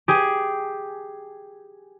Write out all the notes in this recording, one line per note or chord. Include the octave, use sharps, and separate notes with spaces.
G4 G#4